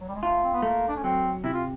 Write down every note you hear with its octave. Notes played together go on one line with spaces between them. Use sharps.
F#3
G3
G#3
A3 F4
C4
B3
A3 A#3
D4
C#4
F#3 C4
C3 E4
F4